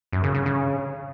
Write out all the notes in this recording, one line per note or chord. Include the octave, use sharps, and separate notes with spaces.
F#2
C#3
C#3
C#3